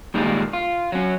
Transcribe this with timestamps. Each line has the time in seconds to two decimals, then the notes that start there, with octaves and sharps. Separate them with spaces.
0.14 A#2 D#3 G3 G#3 A#3
0.53 F4
0.92 F#3 C#4